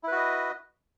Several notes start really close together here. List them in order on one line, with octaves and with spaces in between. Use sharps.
E4 B4 F#4 D#5